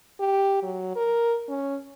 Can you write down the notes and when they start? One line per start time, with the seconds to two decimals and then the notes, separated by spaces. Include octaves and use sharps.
0.20 G4
0.63 F#3
0.96 A#4
1.48 C#4